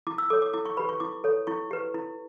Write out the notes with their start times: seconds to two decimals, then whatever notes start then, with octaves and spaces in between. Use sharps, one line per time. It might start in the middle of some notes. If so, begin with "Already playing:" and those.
0.07 E4 D6
0.18 E6
0.30 A4 C#5 D6
0.42 D6
0.53 E4 D6
0.65 C#6
0.77 G4 B4 B5
0.89 C#6
1.00 E4 D6
1.24 A4 C#5
1.47 E4 C#6
1.71 G4 B4
1.94 E4